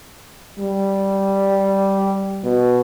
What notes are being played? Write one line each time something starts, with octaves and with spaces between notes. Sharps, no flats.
G3
B2